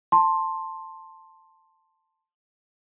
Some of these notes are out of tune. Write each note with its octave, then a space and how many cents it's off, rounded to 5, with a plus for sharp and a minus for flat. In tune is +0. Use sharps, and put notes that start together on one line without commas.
A5 +10 C6 +10